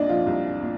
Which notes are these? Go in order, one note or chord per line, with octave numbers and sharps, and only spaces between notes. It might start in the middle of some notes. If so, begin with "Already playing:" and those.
Already playing: C2 A#2 D4 D#4 D5 D#5
F3 F4
C2
A#2